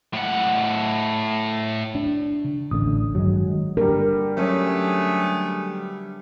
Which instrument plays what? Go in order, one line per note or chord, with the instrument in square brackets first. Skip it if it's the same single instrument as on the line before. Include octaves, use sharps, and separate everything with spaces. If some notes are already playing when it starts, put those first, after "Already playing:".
[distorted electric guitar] A2 F#5
[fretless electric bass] D4
[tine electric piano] C#3
[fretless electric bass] A1 D3 [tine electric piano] D#6
[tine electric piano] G2 D#3 [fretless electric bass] F#3 G#3
[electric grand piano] D3 G3 [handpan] A#4
[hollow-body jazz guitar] F#3 C#4 C#5 [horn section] A3 B3 G#4